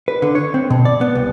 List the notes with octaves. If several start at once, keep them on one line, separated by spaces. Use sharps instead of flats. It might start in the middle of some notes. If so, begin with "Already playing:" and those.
B4
D3
C#5
C4
B2
D5
B3
C2